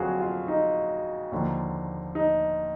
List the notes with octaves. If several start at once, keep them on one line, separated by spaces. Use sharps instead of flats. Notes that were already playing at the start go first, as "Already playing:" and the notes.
Already playing: F2 D3 F#3 F4 F#4 G#4
F4
D#4
D#2 D3 F3
D#4